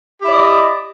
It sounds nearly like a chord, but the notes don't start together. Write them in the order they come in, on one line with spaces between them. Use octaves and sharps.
G4 E4 D5 D#5